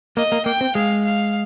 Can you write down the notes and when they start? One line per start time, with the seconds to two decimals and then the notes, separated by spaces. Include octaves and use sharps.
0.17 A#3 D#5
0.32 A#3
0.46 A#3 G5
0.61 C4
0.75 G#3 F5
1.05 F5